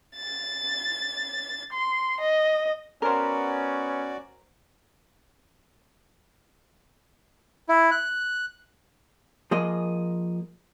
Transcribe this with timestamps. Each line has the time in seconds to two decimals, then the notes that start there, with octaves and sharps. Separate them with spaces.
0.16 A6
1.73 C6
2.21 D#5
3.02 B3 C#4 F#4 A#4 C5 D5
7.69 E4
7.91 F#6
9.51 F3 A#3 G#4 D#5